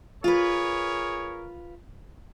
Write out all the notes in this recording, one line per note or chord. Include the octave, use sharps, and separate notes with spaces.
F4 G#4 A#4 B4 C#5